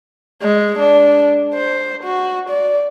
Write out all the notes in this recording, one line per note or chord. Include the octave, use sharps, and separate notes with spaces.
G#3
D4
C5
F#4
D5